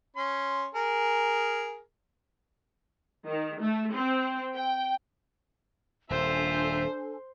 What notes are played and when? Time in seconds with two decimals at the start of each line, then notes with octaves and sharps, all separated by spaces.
0.16 C#4 C6
0.75 G#4 A#4
3.27 D#3
3.59 A3
3.94 C4
4.55 G5
6.10 D#1 C4 D4 F4 A4 C5 E5 G#5